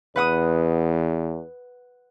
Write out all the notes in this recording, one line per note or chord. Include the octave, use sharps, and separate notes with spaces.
E2 B4 F#5 D#6